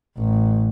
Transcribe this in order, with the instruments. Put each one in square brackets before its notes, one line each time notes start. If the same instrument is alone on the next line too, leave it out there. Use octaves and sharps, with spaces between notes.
[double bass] A1